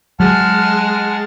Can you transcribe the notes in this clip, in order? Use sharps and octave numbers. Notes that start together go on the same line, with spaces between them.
F#3 G#3 F#5 A5 F6